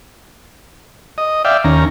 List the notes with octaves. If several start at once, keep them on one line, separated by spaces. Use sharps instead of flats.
D#5
D5 E5 F5 G5
D#2 C#4 A#5